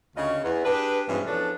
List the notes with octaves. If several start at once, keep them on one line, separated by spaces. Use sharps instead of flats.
D2 C#3 F4 F#4 G#4 D#5
E2 B3
D4 G4 G#4 B4
G2 B2 E3 G#3 C4 C#4
E2 F3 C#4 D4 A4 B4